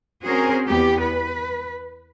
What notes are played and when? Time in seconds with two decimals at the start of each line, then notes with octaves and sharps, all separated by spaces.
0.24 C4 C#4 F#4 G#4 A#4 C5
0.67 E2 B3 G4
1.00 B4